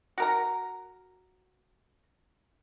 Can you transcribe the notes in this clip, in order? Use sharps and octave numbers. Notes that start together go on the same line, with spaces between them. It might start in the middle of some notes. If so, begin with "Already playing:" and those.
F#4 A#4 A#5